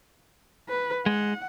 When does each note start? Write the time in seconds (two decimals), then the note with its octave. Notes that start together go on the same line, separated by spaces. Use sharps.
0.69 B4
1.06 G#3 F#5